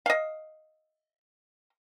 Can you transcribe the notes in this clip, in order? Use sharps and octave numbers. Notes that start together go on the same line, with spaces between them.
D#5 F5